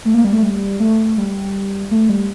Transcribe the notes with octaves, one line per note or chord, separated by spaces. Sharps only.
A3
A#3
G3
A3
G3
A3
G3
A3
G3